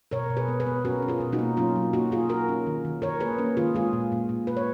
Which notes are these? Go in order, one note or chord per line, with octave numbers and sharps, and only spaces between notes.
B2 A#4 C#5
B2
G#4 B4
B3
G#4 B4
B3
C#4 F#4 A#4
C#4
F4 G#4
B2
D#4 F#4
A#3
F#3 C#4 F4
F#3
A#3 D#4 F#4
A#3 F4 G#4
A#3 F#4 A#4
C#4
D#3
D#3
D#3 A#4 C#5
A#3 G#4 B4
A#3 C#4
D#3 F4 G#4
G#3 F4 G#4
A#2
A#2
A#2
A#2 B4
C#5